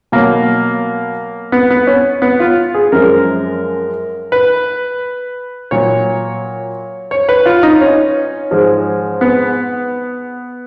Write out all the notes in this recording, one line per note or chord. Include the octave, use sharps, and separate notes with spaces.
B2 F#3 A#3
B3
B3
C#4
B3
F4
G#4
F#2 F3 G#3 A#4
B4
A#2 F#3 C#5
C#5
B4
F4
D#4
C#4
G#2 F3 G#3
B3